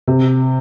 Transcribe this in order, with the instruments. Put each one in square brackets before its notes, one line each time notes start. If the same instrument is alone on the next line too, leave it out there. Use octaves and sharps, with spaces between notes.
[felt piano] C3